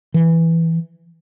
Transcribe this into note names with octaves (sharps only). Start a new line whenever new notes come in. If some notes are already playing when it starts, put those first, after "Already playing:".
E3